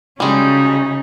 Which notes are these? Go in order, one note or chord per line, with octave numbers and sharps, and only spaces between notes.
C#3 G3 G#3 C#4 D#4 F#4 A5 D#6